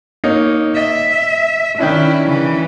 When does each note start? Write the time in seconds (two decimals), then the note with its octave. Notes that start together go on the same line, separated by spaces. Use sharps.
0.24 A#3 D#4 C#5
0.77 D#5 E5
1.78 D#3 C#4 D4 E4
2.26 C#3 E3